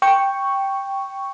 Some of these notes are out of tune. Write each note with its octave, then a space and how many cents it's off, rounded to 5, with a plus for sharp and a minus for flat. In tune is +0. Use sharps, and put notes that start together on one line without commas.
G5 +0 C#6 +0